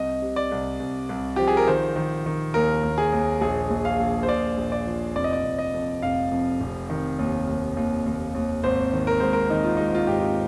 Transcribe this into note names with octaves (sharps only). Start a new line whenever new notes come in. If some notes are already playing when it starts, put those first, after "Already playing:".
Already playing: C2 D#5
C3
D5
C2
C2
C2
F3 G4
G#4
A#4
D#3 C5
D#3
D#3
D#2 A#4
D#2
G#4
D#2
A#1 G#4
A#1
F5
A#1
C5
A#1 D5
A#1
D5
F3
F1 D5
D#5
D5
F1
D#5
F2
F1 F5
F2
F1
D#3
D#2
D#2
D#2
D#2
D#2
G#1 C5
D#3
A#4
G#2 C5
A#4
D#3 D#4
F4
G#2 D#4
F4
G#1 G4
F4